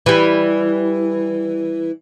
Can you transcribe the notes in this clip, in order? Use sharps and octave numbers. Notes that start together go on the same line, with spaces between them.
E3 G3